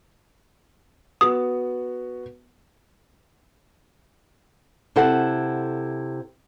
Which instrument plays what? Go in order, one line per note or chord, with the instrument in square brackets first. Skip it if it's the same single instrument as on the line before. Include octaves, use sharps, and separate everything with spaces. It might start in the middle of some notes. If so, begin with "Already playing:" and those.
[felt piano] B3 F#4 [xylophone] D#6
[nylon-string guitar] C3 E4 A4 C5 F#5